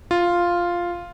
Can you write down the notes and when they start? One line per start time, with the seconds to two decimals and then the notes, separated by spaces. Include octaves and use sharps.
0.11 F4